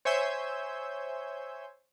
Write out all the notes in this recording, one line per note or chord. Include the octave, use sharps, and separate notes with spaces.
C5 C#5 E5 G#5 E6 G6